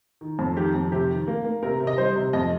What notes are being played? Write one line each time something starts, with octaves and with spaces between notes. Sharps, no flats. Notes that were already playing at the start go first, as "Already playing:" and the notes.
D#3
F2
D#3 G4
F2
C3 G4
D#3
A#3
A#3
C3 A#4
C3
D#5
G3 C5
C3
F2 D#5